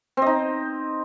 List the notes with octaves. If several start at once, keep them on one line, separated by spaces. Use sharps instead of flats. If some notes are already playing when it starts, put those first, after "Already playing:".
C4 D#4 D#5